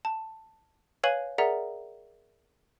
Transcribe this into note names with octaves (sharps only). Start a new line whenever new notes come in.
A5
B4 C#5 F5 G#5 D#7 F#7
G#4 A#4 D5 E5 F#5 A#5